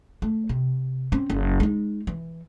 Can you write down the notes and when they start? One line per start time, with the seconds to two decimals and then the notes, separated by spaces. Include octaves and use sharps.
0.22 A3
0.49 C3
1.12 C4 C#4
1.30 F#1
1.60 G#3 D#4
2.07 E3